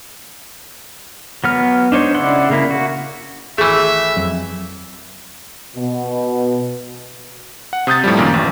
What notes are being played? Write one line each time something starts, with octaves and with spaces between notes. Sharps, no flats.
F#3 B3 F6
D4 D#4 C5 C#5
C#3 E4 D5 F#5 C6
C#3 A#3 E4
F#4
G#1 E3 A3 G#4 E5
F2 F#3
B2
F#5
C3 D#6 G6 A6
A2 F3 G3
F#2 A#2 D#3 A#3
A1